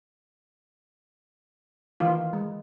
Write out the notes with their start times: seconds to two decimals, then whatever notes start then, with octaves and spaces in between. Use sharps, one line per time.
2.00 D#3 E3 F4
2.33 G#3